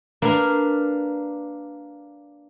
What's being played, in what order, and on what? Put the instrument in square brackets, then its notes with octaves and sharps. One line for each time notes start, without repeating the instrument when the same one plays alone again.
[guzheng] A#3 D4 A#4 B4 F5